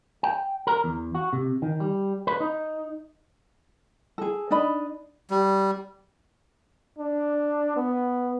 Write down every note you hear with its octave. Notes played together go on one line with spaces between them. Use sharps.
G5
A#4
E2
F#4
C3
D#3
G3
B4
D#4
G#4 A4
D4 D#4 D#5 B5
G3
D4
B3